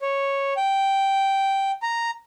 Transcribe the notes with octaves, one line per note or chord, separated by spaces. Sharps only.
C#5
G5
A#5